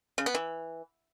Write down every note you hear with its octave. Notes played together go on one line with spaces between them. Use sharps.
C#3
B3
E3